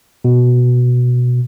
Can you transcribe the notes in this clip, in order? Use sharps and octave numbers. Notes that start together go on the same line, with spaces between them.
B2